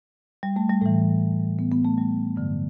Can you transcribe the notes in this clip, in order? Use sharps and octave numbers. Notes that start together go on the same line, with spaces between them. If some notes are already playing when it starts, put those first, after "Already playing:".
G3
A3
G3
A2 E3 A3
B3
B3
A3
G3
G2 D3 F#3